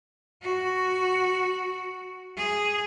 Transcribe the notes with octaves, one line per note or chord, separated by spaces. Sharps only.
F#4
G#4